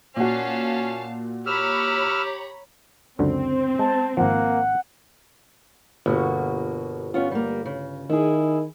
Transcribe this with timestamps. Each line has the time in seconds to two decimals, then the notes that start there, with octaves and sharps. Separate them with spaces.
0.16 A#2 C#4 F#4 F5 A5
1.46 G4 C#5 A#5 B5 E6 F6
3.19 C#2 F#2 D3 C4 C5
3.79 G#3 A5
4.17 G#1 F3 A#3 F#5
6.06 G1 B2 A#3 F#4
7.14 B3 C#4 F4
7.31 G3 A#3
7.66 C#3
8.10 D#3 E4 G#4